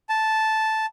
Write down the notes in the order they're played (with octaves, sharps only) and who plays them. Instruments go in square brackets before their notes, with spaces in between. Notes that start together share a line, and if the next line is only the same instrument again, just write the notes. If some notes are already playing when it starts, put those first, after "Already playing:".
[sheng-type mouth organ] A5